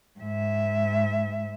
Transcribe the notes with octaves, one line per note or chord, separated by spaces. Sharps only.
G#2 E5